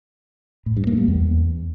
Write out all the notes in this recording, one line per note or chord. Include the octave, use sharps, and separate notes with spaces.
A2
G2
A#3
G3
E2